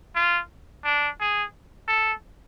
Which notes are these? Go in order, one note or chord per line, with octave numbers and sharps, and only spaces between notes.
F4
D4
G#4
A4